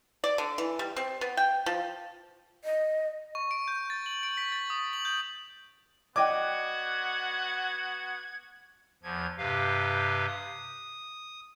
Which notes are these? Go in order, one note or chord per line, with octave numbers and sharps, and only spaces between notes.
D5
D3
E3
G3
C4
B3
G5
F3
D#5
C#6
D7
G6
A6
F#7
D7
B6
A6
D#6
F#7
G6
B3 F#4 D5 D#5 F#5 G5 D6 G#6
E2 F3 G#6
G2 C3 G4 B4 F5
D#6